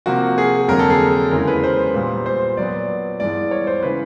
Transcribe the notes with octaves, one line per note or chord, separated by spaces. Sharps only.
C3 F3 A#3 F#4
G#4
F2 D3 F#3 A#3 A#4
A4
G#4
E2 C#3 E3 G#3 A#4
B4
C5
A#2 G3 B3
C5
A#2 F#3 B3 D5
G2 E3 G#3 B3 D5
C#5
C5
C#3 E3 B4